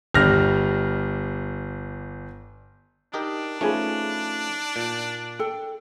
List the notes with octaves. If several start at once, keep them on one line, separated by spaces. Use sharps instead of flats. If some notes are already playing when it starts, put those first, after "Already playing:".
G1 G3 D4 G4 F6 A#6
D4 D#4 G4 A#4
F3 A3 C#4 D#4 G#4 B4
A#2
A4 G5